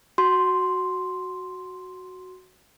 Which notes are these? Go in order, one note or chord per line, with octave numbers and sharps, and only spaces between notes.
F#4 C6